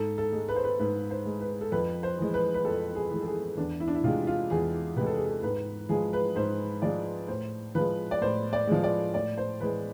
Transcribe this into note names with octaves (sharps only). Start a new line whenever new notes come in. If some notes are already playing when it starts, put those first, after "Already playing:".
Already playing: G#2 A4
A4
G#3
B4
C5
B4
G#2 B4
C5
G#3
B4
A4
F2 B4
C5
E3 G#3
B4
B4
F2 A4
G#4
E3 G#3
A4
G#4
E2 D4
E4
D4
E4
C3 G#3 F4
F4
E2 G#4
C3 G#3 B4
A4
G#4
A4
G#2 B4
F3 G#3 G#4
B4
G#2 C5
F3 G#3 D5
A2 C5
F3 G#3 B4
D5
A2 C5
D5
F3 G#3
D5
A2 D5
C5
E3 G#3 B4